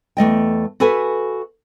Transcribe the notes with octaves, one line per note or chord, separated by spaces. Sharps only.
E2 A3 D#5 G5
F#4 A4 B4 E5 G#5